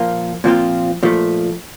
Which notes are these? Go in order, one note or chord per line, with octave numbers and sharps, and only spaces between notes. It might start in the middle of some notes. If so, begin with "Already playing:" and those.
Already playing: A#2 F3 A#3 F4
A#2 F3 C4 F4
A#2 F3 A3